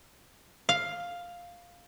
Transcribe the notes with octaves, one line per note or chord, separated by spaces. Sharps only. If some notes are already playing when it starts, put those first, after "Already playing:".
F5